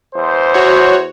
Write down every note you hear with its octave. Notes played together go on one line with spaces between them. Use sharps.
E2 C5
F#4 C#5